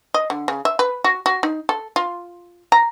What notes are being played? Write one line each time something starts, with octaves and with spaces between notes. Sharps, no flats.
D#5
D3
C#3
E5
B4
F#4
F#4
D#4
A4
F4
A#5